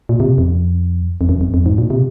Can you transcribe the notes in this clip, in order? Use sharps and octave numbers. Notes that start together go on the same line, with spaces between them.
A#2
C3
F2
F2
F#2
F2
F2
G#2
A#2
C3